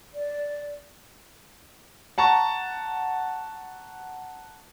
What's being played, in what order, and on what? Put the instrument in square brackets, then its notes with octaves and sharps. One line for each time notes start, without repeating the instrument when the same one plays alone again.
[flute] D5
[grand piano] F#5 A5 A#5 C#6